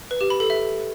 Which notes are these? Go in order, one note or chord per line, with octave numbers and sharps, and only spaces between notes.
B4
G4
B5
A4
E5